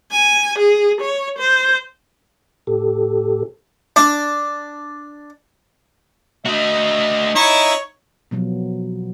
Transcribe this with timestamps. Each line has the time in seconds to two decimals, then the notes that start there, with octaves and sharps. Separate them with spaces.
0.12 G#5
0.59 G#4
1.01 C#5
1.38 C5
2.67 A2 G4 A4
3.96 D4
6.46 A3 F#4 D#5
7.36 D#4 E4 C#5
8.31 B2 F3 F#3 B3